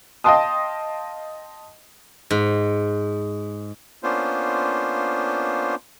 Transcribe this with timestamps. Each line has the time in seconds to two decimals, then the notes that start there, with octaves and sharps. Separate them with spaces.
0.24 D#5 F5 G5 A5 C6 D#6
2.31 G#2
4.03 A#3 B3 C#4 D4 F4 C5